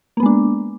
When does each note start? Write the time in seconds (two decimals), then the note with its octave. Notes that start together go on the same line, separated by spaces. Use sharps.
0.17 A#3
0.20 B3
0.23 G#3
0.26 D4